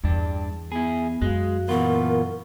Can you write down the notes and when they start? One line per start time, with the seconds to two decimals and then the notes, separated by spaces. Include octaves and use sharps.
0.04 E2 G2 D4
0.72 B3 E4 G#4
1.22 F#2 G#3 F#4 F5
1.69 A#2 E3 B3 F4 A#4 F#5 C#6